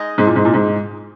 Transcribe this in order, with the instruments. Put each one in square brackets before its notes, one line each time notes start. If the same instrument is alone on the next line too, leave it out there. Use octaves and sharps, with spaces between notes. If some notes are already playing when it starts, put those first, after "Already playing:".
Already playing: [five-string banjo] G#3 D#4 D#5
[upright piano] G#2
A#2
G#2
A#2
G#2